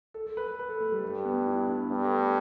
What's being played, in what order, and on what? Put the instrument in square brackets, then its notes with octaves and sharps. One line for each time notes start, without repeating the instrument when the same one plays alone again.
[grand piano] A4
A4
B4
B4
B4
A4
A3
G3
[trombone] G2 [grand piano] A3
[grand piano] B3
E4
D4
[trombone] G2 [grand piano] B3
[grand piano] A3
A3